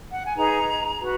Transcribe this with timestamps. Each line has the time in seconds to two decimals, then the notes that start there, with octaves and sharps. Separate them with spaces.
0.11 F#5
0.24 G#5
0.36 D#4 G#4 B4 A#5
0.99 F#4 B4